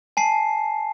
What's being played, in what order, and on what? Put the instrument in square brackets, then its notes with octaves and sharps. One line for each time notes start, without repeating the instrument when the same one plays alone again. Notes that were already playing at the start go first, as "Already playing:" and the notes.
[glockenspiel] G#5 A5 C7